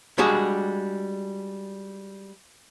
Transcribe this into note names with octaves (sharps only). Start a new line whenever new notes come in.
G3 G#3 D4 F#4 G#4